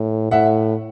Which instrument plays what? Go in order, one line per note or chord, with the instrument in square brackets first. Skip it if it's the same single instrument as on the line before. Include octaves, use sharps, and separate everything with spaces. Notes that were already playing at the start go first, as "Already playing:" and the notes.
Already playing: [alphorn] A2
[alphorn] A2 [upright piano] E5 F#5